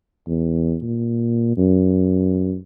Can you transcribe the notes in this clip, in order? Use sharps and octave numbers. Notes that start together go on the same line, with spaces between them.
E2
A#2
F#2